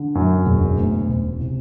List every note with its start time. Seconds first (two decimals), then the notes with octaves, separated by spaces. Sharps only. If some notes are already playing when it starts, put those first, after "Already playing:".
Already playing: D3
0.15 F#2
0.46 E1
0.77 D2
1.08 E1
1.40 C3